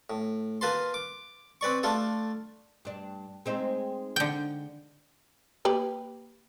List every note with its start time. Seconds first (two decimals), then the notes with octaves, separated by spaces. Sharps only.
0.10 A2
0.61 A#3 F4 B4 A5 C6
0.94 D6
1.61 C4 B4 D5 C#6
1.83 A3 D4 F4 A4
2.85 G2 D4
3.46 G#3 C4 D#4
4.16 D3 G5
5.65 A#3 G4 B4